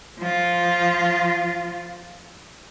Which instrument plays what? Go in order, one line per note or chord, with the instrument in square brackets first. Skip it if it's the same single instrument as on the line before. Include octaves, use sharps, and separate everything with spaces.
[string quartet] F3 F4